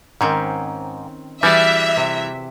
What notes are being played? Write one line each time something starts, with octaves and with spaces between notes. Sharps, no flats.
G#2 D#3 C4 C#4
E3 G3 F#4 G#4 D5 E5
C3